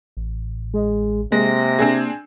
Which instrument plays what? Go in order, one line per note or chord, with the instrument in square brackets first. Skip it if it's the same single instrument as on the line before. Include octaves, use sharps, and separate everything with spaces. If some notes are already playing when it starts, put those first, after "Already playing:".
[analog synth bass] A1
[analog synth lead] G#3
[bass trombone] C3 [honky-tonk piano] G#3 [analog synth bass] A#3 [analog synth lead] A#6
[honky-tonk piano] C4 D4 G#4